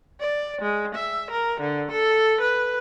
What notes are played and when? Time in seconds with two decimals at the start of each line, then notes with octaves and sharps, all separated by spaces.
0.20 D5
0.61 G#3
0.95 E5
1.31 A#4
1.61 D3
1.91 A4
2.41 B4